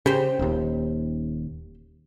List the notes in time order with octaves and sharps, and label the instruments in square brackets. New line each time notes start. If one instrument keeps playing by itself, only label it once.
[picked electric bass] C#3 [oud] G4 C5
[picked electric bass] D#1 D#2